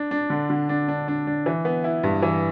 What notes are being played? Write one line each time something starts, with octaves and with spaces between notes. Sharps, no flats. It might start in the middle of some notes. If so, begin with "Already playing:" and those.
Already playing: D4
D4
D3
D3
D4
D4
D4
D4
E3
B3
E4
G2
E3